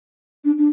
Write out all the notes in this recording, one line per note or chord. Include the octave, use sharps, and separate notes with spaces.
D4
D4